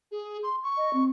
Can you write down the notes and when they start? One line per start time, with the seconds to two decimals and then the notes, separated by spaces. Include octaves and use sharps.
0.12 G#4
0.43 C6
0.64 C#6
0.77 D#5
0.93 C4